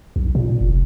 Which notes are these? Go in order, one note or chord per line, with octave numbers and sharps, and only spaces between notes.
B1
A#2
F1